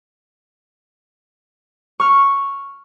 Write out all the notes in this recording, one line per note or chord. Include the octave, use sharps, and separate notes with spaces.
C#6 F6